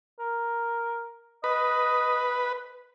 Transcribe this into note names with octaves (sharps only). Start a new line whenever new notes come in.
A#4
B4 D#5